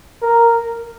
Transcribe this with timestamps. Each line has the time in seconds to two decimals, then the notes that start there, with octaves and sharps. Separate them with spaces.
0.22 A#4